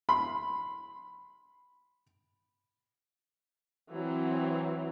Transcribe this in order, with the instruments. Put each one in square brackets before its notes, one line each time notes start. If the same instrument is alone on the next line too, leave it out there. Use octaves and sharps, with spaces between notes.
[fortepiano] B5 C6
[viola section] E3 F#3 C4